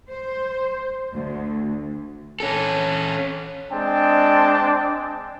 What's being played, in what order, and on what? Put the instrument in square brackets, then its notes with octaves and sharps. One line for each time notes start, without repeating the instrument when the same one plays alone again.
[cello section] C5
D2
[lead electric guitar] C#4 A4
[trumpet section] G#3 C4 D4 G5 A5